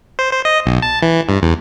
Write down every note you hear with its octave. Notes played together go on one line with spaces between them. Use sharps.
C5
C5
D#5
B1
A5
E3
G2
E2